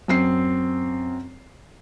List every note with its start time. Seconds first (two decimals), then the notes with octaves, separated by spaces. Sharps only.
0.08 F#2 C4 C7